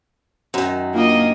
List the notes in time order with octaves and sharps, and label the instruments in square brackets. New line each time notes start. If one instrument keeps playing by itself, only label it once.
[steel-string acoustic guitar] F#2 D#3
[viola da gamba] A#3 D#5 [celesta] D4 F4